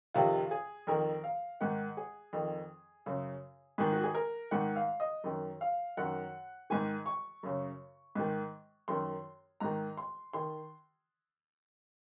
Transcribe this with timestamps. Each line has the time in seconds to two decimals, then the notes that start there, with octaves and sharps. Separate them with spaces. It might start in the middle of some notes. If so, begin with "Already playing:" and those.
0.14 F2 C3 D#3 F4
0.51 G#4
0.87 F2 D#3 A#4
1.24 F5
1.61 G#2 D#3 F#5
1.97 G#4
2.33 F2 D#3
3.06 F#2 C#3
3.78 G#2 D#3 G#4
3.92 F#4
4.04 G#4
4.15 A#4
4.51 G#2 D#3 F#5
4.76 F5
5.00 D#5
5.24 F#2 D#3
5.61 F5
5.97 F#2 D#3 F#5
6.70 G#2 D#3 G#5
7.06 C#6
7.43 F#2 C#3
8.15 G#2 D#3
8.88 F#2 D#3 C6
9.60 G#2 D#3 A#5
9.97 C6
10.33 D#3 C6